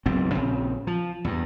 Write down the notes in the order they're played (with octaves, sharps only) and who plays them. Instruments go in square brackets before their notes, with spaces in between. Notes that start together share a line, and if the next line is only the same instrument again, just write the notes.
[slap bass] F#1 B1 G#2 C4
A#1 C#3 C4
F3
E2 G2